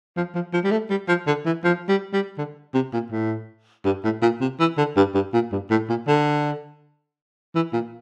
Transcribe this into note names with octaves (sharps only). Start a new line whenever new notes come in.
F3
F3
F3
G3
A3
G3
F3
D3
E3
F3
G3
G3
D3
C3
A#2
A2
G2
A2
A#2
C3
E3
D3
G2
G2
A#2
G2
A2
A#2
D3
E3
A#2